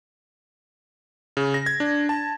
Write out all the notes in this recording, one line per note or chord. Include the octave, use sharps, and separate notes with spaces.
C#3
A#6
G#6
D4
A5